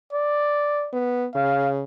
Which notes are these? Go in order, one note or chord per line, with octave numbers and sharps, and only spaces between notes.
D5
B3
C#3 F5